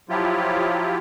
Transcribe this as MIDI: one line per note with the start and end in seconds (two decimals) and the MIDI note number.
0.09 0.98 53
0.09 0.98 54
0.09 0.98 64
0.09 0.98 65
0.09 0.98 67